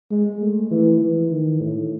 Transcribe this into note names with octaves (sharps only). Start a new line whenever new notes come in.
G#3
A3
E3
E3
D#3
A2